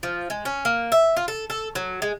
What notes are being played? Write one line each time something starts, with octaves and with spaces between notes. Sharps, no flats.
F3
G#3
C#4
A#3
E5
F4
A4
A4
F#3
G#3